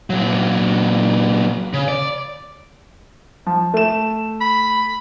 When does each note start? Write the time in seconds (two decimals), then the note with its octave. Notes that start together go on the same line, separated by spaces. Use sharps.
0.10 A#2 F#3
1.73 C#3
1.88 D5
3.47 F3
3.74 A3 E7
4.41 B5